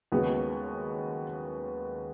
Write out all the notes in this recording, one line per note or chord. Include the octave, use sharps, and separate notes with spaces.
D#2 C#3 G#3 B3 F#4